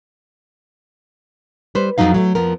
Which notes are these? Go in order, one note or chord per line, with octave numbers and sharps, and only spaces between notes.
G3 B4 C5
F2 C3 F#3 D#4 F5
F#3 G#3 A3
F2 F3 B3 A#4